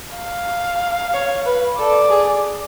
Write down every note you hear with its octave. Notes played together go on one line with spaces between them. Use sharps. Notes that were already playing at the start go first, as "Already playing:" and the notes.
F5
C#5
B4
A4 D5
G#4